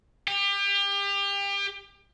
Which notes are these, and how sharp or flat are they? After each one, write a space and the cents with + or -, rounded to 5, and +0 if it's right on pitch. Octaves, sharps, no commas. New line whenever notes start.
G4 +30